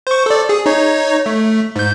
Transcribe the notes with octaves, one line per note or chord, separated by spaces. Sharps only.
C5 C#6
A4 D5
G#4
D#4 C#5
A3
G#2 G6